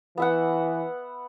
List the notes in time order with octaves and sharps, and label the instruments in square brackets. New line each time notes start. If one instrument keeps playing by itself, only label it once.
[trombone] E3 [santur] B3 E5 F#5